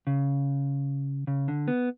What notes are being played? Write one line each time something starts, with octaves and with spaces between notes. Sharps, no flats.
C#3
C#3
D3
B3